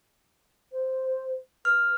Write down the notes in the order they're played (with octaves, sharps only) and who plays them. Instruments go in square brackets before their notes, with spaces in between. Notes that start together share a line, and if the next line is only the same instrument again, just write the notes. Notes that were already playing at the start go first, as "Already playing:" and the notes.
[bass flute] C5
[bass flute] B4 [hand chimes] F6